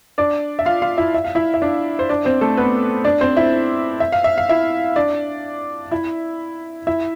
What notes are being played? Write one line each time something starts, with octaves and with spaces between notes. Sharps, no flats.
D4 D5
E5
F4 F5
F4 F5
E4 E5
E5
F5
E4 E5
E5
D4 D5
C5
D4 D5
C4 C5
A3 A4
B3 B4
D4 D5
C4 C5
E4 E5
E5
F5
E5
F5
E4 E5
D4 D5
E4 E5
E4 E5